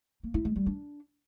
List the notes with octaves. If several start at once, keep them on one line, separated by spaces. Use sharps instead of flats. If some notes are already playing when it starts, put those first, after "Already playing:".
A#3
E4
G#3
G3
D4